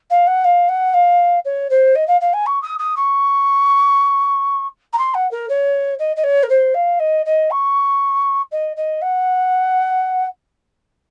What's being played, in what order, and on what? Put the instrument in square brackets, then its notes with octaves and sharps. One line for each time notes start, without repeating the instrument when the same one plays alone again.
[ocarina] F5
F#5
F5
F#5
F5
C#5
C5
D#5
F5
F5
G#5
C#6
D#6
D#6
C#6
A#5
C6
F#5
A#4
C#5
D#5
D#5
C#5
A#4
C5
F5
D#5
D#5
C#6
D#5
D#5
F#5